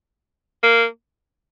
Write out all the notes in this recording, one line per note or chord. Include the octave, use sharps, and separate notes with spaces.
A#3